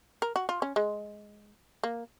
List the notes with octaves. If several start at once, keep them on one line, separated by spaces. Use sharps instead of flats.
A#4
F#4
F4
C#4
G#3
A#3